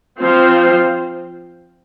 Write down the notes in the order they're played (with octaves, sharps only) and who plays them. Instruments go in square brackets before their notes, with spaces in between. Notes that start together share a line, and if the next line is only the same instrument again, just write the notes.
[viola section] F3 C4 F4 C5